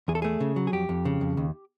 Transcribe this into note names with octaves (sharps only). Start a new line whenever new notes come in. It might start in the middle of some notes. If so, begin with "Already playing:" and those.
E2 G#4
A4
A3 G#4
C#3
F#3
G#4
F2 G4
F2
C#3
F2
D#2